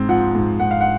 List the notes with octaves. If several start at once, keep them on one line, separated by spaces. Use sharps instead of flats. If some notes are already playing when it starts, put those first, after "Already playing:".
Already playing: G#2 C4
F3 F#5
G#2
G#2 F#5
F5
F#5